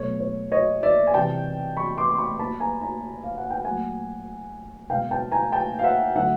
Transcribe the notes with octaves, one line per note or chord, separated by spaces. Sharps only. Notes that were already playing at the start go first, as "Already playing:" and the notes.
Already playing: B2 F#3 A3 C#5
C#5
C#5 D#5
D5 E5
G#5
C3 E3 G3 G5 A5
B5 C#6
C6 D6
C6
B5 C#6
A#2 G3 A5 B5
G#5 A#5
G#5 A#5
F5
F#5
G5
A#2 F#3 A3 F#5 G#5
B2 G#3 F5 G5
G5 A5
G#5 A#5
G5 A5
F5
E5 F#5
D3 F#3 A3 E5 F#5